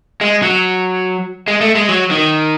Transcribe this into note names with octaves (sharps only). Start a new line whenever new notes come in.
G#3
F#3
G#3
A3
G#3
F#3
D#3